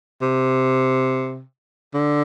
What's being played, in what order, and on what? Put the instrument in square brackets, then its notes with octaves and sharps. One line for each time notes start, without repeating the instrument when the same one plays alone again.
[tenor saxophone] C3
D3